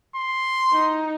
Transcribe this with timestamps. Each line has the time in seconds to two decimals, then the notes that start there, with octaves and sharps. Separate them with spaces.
0.16 C6
0.73 D#4